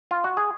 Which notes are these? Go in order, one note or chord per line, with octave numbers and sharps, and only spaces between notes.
F4
F#4
G#4